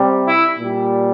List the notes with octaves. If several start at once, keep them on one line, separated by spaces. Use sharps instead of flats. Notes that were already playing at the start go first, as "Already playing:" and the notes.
Already playing: C3 G3
E4
A#2 G3